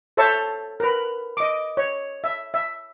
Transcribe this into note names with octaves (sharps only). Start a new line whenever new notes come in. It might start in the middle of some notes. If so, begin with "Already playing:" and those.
A4 C5 C#5 E5 A5 C#6
A#4 B4
D#5 D6
C#5
E5
E5